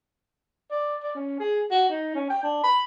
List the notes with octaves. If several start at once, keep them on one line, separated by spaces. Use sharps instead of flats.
D5
D5
C#4
G#4
F#4
D#4
C#4
G5
D4
B5